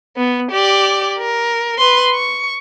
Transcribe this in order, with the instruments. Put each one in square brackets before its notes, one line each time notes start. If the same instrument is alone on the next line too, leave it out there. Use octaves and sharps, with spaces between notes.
[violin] B3
G4 D5
A#4
B4 C6
C#6